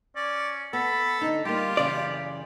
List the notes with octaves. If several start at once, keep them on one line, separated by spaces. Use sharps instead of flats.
C#4 D5
B3 A4 B5
D3 D#4
G3 A#3 F4 G4
F#2 C#3 E3 D5